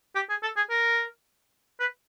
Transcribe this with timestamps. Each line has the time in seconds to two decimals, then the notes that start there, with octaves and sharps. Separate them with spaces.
0.15 G4
0.30 G#4
0.43 A4
0.57 G#4
0.70 A#4
1.80 B4